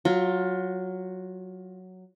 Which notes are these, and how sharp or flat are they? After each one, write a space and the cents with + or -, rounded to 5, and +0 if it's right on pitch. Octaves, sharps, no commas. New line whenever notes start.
F#3 +0 F4 +20